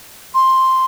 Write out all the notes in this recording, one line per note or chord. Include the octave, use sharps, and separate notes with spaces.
C6